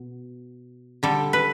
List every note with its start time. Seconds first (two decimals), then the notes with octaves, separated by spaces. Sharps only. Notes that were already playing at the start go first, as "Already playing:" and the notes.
Already playing: B2
1.03 D3 G3 A4
1.33 B4